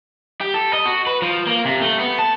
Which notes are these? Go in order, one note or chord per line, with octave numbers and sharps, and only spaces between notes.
G4
A4
D#5
F#4
B4
F3
A#3
C3
A3
B3
A5